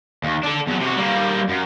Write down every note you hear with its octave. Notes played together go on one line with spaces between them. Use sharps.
D#2
D4 A4
E2 F#3
C3 F#4
G3 A#3
F#2